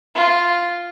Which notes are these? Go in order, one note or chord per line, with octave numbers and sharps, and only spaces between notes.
F4